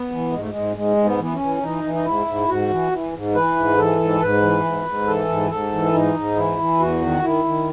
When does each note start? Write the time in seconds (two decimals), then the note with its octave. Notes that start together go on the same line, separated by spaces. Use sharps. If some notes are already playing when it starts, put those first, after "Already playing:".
Already playing: B3
0.11 E3
0.32 G#2 G#3
0.40 A3
0.49 G#3
0.54 G#2
0.76 G#2 G#3
0.97 G#2
1.05 B3
1.18 E3 B3
1.33 C#4
1.41 E3
1.62 E3 D#4
1.83 E3
1.94 D#4
2.05 G#2 E4
2.26 G#2
2.48 G#2 F#4
2.70 E3
2.91 E3
3.14 G#2
3.34 E3 B4
3.56 G#2
3.78 E3 A4
4.00 G#2
4.21 G#2 B4
4.42 E3
4.64 G#2
4.86 G#2
5.07 E3 A4
5.28 G#2
5.50 G#2 A4
5.72 E3
5.93 G#2 D#4
6.15 G#2
6.37 E3 E4
6.59 E3
6.79 E2 F#4
7.02 D#3
7.23 D#3 E4
7.45 D#3